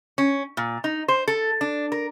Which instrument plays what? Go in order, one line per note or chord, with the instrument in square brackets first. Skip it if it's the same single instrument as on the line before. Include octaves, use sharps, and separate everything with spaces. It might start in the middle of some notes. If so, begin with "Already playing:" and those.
[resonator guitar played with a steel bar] C#4
A#2
D#4
C5
A4
D4
A#4